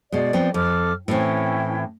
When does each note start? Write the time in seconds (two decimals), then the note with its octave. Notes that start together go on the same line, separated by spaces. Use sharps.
0.12 B2 G#3 D5
0.33 F3 B3 C4
0.54 F2 A4 D6 F6
1.08 A2 E3 C4 C#4 E4 G5